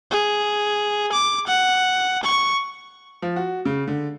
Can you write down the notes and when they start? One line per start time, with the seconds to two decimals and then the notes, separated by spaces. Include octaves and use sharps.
0.11 G#4
1.13 D6
1.47 F#5
2.24 C#6
3.22 F3
3.36 F#4
3.65 C#3
3.88 D3